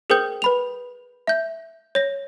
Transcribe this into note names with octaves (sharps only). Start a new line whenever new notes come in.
G#4 A#4 C5 G5 D#6 G6
B4 B5 F7
E5 G6
C#5 A#6